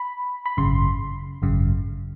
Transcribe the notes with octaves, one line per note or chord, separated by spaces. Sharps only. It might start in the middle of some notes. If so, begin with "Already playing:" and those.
Already playing: B5
B5
G#1 F#2 C#3 C6
G#1 F#2 C#3